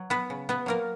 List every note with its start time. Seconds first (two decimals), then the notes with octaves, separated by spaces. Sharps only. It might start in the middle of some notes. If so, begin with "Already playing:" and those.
Already playing: F#3
0.10 B3 B4
0.30 C#3
0.49 B3 B4
0.66 F#3 A#3 A#4